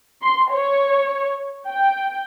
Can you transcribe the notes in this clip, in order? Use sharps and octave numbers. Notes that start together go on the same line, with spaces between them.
C6
C#5
G5